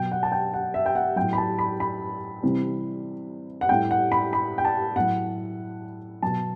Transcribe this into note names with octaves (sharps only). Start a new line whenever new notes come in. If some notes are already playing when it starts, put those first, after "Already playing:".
Already playing: B2 F#3 G5
F#5
A5
G5
F#5
E5
G5
F#5
A2 F#3 G5
B5
A5
B5
B5
C3 E3 G3
F#5
A2 G3 G5
F#5
B5
B5
G5
A5
A2 F#3 F#5
B2 F#3 A5